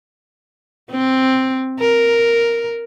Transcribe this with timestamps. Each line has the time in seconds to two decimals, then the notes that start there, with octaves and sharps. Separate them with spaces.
0.91 C4
1.81 A#4